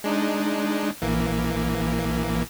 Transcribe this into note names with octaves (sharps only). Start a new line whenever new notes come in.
G#3 D4 D#4
A#1 E3 A#3